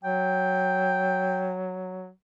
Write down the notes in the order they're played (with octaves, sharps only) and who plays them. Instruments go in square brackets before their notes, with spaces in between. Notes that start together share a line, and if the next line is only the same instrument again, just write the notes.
[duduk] F#3 [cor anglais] G5